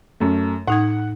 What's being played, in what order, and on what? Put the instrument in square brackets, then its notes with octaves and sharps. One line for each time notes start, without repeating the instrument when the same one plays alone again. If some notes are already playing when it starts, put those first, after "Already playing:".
[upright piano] F#2 A3
[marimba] A2 D#4 G#6 [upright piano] F#5